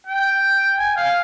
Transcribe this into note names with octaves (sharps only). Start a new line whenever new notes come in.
G5
G#5
F5